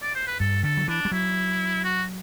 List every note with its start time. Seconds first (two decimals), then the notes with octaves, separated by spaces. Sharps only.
0.02 D5
0.15 C5
0.27 B4
0.40 G2 A4
0.63 D3 A4
0.77 F#3
0.88 E3 D4
1.05 G3
1.12 F#3 E4
1.84 F#4